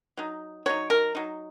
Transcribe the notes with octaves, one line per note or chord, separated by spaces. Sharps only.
F#3 D#4
F#3 D#4 C#5
A#4
F#3 D#4